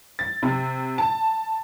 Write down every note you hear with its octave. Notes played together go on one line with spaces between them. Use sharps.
A6
C3
A5